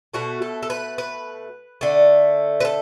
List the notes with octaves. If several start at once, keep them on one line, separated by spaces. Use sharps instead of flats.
B2 A3 F#4
A4
A4
B4
B4
D3 A3
B4
A4